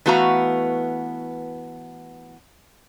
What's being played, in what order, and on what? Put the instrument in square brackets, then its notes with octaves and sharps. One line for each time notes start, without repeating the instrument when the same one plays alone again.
[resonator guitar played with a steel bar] E3 A3 B3 F#4 F5 A#5